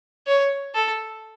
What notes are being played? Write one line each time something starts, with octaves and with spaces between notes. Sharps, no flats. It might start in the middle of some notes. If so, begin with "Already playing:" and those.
C#5
A4